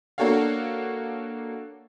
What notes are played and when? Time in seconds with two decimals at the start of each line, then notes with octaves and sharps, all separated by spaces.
0.18 A#3 D4 F#4 A4 C#5 F5